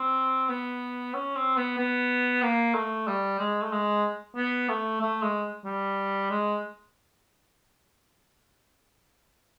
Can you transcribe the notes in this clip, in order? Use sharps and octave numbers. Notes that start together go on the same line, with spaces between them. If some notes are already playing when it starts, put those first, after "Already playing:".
Already playing: C4
B3
C#4
C4
B3
B3
A#3
A3
G3
G#3
A3
G#3
B3
A3
A3
G#3
G3
G#3